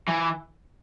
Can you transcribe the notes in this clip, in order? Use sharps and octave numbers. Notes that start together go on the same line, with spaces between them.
E3